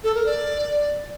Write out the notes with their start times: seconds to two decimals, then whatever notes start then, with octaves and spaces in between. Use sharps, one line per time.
0.04 A4
0.15 A#4
0.26 D5